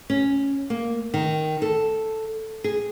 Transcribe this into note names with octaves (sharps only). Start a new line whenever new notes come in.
C#4
A#3
D#3
A4
G#4